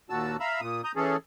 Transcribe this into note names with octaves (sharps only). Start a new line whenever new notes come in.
D#2 A#2 F#4 A5 E6
E5 F5 A#5 B5 E6
A#2 D#6
A#5 D#6 G6
E3 C#4 G#4 A4